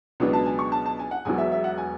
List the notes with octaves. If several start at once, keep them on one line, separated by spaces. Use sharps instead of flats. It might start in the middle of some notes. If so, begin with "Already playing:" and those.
C#2 B2 F#3 B3 D4
A5
G#5
C#6
A5
A5
G#5
F#5
E1 E2 B2 F#3 G#5
E5
E5
F#5
G#5